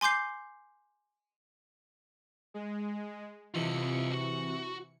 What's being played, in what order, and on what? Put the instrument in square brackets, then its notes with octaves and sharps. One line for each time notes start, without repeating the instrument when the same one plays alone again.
[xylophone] G#5 C6 D6 G6 C7
[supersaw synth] G#3
[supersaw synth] C3 E3 C#7 [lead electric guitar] F4 D#5
[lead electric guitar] F#4